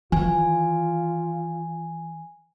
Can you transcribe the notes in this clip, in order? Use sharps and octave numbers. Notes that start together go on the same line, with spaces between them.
D#3 E3 F4 G#5